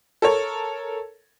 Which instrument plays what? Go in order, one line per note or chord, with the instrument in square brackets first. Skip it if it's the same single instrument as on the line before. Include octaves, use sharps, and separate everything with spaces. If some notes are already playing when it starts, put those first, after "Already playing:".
[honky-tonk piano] A4 A#4 C#5